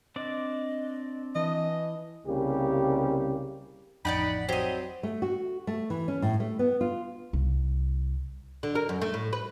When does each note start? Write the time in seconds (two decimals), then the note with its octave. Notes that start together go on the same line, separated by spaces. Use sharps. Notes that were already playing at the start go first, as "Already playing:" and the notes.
0.16 C4 D4 D5 D#5
1.35 E3 D#5 A5
2.25 C2 C#3 G3 A#3 G4
4.05 A1 F2 D#4 D5 F#5 G5 B5
4.49 F#3 C4 G4 D#5
5.03 A3
5.22 F#4
5.67 A3
5.90 E3
6.08 C#4
6.22 A2
6.40 A3
6.59 B3
6.81 F4
7.33 C2
8.63 D3
8.75 A#4
8.89 F#2
9.01 A3
9.14 A2
9.33 B4